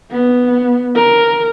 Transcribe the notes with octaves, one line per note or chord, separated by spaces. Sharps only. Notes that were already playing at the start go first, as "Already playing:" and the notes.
B3
A#4